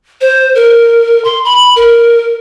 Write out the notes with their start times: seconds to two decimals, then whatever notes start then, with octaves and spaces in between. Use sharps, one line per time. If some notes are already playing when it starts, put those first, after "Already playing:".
0.21 C5
0.55 A#4
1.25 C6
1.45 B5
1.76 A#4